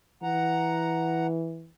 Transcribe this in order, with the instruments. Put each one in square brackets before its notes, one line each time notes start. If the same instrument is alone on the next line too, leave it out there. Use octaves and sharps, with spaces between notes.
[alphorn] E3 [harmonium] F#5 A#5